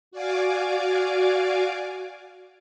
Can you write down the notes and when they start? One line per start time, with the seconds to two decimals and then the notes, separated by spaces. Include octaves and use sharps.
0.11 F#4 D5 F5 G#5 D6